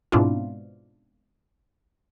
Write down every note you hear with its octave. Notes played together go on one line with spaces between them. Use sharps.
G#2 B2 C4 D4 E4 F4